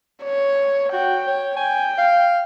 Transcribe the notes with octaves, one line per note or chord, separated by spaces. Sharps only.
C#5
F#4 G5
C#5
G5 G#5
F5